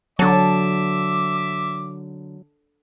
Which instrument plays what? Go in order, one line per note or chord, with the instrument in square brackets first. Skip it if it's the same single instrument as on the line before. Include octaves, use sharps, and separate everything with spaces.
[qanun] D3 A5 [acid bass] F#3 [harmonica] E5 D6